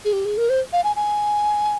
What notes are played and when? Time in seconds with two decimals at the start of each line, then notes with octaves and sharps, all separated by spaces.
0.05 G#4
0.13 G4
0.25 G#4
0.37 A#4
0.50 C5
0.73 F5
0.84 G#5
0.96 G#5